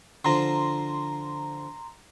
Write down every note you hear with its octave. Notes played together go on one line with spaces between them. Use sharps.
D3 F3 A#5 C6